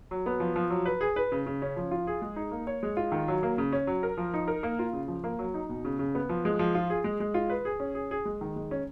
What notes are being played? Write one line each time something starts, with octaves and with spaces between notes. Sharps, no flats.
F#3
B3
F3
F3
F#3
B4
G#4
B4
C#3
C#3
C#4
F3
F4
G#4
G#3
D#4
A#3
C#5
G#3
F4
D#3
F#3
A#3
C#3
C#4
F#3
A#4
F3
D#4
A#4
A#3
F4
C#3
F3
A#3
F#3
D#4
B2
C#3
C#3
B3
F3
G#3
F3
F4
G#4
G#3
G#3
F4
B4
G#4
C#4
G#4
G#4
G#3
D#3
G#3
C#4